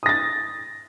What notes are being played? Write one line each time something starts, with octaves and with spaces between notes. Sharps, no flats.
D#6 A6 A#6